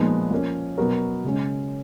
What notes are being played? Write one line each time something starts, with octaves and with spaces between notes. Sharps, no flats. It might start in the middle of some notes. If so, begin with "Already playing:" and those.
Already playing: A#2 F3 G#3 B3 D#4
F3 A#3 C#4
B2 F#3 B3 F#4 A#4
C#3 G#3 C#4